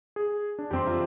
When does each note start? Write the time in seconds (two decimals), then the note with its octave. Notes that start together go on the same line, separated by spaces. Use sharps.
0.16 G#4
0.59 D4
0.71 F2 G3 C4 G4 C6
0.86 F4 E5 A#5